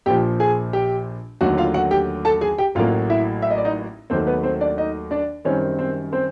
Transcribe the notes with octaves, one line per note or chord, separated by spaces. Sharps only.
A#1 A#2 F3 G4 G5
G#4 G#5
G4 G5
D#2 D3 F#3 A3 F#4 F#5
F4 F5
F#4 F#5
G4 G5
A4 A5
G#4 G#5
G4 G5
A1 A2 F#3 A#3 F4 F5
E4 E5
E5
D#5
D5
D#4 D#5
D#2 D#3 F#3 A3 C4 C5
B3 B4
C4 C5
D4 D5
D#4 D#5
D4 D5
F#2 D#3 G3 C4 C#4 C#5
C4 C5
C4 C5